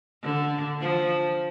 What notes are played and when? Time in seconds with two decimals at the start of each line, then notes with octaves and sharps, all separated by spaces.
0.23 D3
0.80 F3